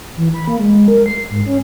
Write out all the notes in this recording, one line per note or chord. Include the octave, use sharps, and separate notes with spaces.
E3
B5
A#3
G#3
A#4
C7
G#2
C#4